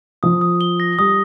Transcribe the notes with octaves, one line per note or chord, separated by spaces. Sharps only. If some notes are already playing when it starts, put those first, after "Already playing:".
F3 D#6
D#6
G7
A#6
G3 D#6